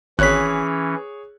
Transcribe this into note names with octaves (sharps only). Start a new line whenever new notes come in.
G#1 E3 C#4 G#4 C#5 F#6 B6